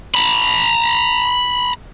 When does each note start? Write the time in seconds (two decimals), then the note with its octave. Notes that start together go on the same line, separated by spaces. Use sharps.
0.15 A#5 B5